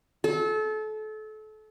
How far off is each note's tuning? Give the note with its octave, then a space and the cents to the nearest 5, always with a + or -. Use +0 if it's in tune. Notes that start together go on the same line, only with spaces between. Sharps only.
A4 -30